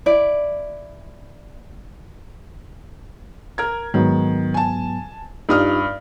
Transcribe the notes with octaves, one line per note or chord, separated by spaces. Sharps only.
E4 D5
A#4 G#6
G#2 D#3 F#3 B3
G#5 A5
G2 D#4 F4 G4 D#6 F6